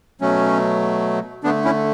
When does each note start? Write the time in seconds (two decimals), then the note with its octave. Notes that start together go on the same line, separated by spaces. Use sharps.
0.21 B2 F#3 A3 C#4
1.44 D3 A3 B3 D4
1.65 C#4 E4